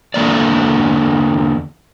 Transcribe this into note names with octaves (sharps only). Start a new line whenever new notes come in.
E2 D3 F3 A#3 D5